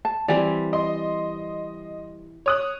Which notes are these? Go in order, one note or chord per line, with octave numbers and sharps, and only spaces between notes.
A5
E3 G3 C4 D5 G#5
D#5 C6
C#5 D#6 F#6